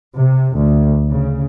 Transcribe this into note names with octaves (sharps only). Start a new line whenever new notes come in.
C3
D2
C#3